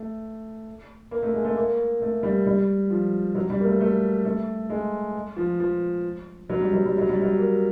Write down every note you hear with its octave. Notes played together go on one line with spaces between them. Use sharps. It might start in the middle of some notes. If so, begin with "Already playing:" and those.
Already playing: A3
A#3
A3
G#3
A3
A#3
A3
G3
G3
F3
F#3
G3
A#3
A3
A3
A3
G#3
F3
F3
F#3
G3
F#3
G3
F#3
G3
F#3
A#3